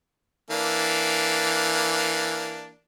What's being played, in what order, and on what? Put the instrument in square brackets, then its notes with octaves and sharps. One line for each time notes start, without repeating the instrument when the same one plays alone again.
[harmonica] E3 A#3 D4